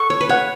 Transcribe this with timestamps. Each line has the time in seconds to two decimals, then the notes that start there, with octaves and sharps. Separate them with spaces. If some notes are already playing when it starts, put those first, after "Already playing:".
Already playing: A4 C#6
0.10 C#5
0.21 B4
0.29 C#5 F#5